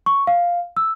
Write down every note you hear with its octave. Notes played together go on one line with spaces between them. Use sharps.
C#6
F5
E6